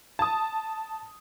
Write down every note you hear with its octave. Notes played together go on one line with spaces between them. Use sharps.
A5 D#6